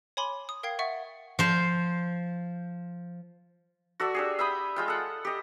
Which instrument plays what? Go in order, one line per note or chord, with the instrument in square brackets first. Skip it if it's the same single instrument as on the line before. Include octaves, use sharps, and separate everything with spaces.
[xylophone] C#5 G#5 B5 C6 D6
D#6
A#4 F5 G5 G#6 C7
E5 F#5 C#6 A6
[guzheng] F3 C5
[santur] F#4 A4 D5 E5
D4 G4 G#4
E5 G5 B5 D#6
G#3 F4 G5
A4 F#5
G4 D#5